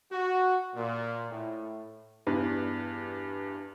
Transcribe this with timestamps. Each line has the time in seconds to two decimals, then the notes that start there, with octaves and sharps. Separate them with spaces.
0.12 F#4
0.75 A#2
1.31 A2
2.27 E2 G2 B4